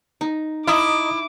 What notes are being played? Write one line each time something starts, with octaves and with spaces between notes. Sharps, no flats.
D#4
E4 D#5 A#5 D6 D#6